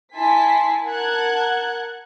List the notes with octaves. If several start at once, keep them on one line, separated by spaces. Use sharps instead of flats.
E4 G#5 A5 C6 B6
A#4 F#5 A5 F#6 G#6